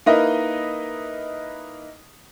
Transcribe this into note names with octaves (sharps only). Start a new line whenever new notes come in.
A#3 D#4 E4 A#4 B4 D#5